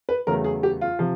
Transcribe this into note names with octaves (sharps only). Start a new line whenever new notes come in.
B4
E2 C#3 F#3 A3 A#4
G#4
G4
F4
C3 F3